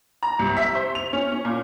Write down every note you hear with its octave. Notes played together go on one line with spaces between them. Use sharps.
A#5
C2
E5
C5
F7
C#4
C#4
A#2